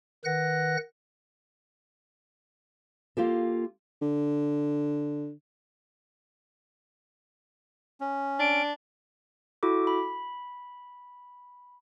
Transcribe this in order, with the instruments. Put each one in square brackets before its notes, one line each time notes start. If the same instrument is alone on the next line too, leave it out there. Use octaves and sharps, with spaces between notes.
[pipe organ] D#3 B4 F#5 F#6 A#6
[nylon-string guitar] A#3 F4 G4 A4
[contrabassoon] D3
[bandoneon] C#4
[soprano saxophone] D4 [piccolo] D7
[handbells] E4 F#4 A4 D6
B5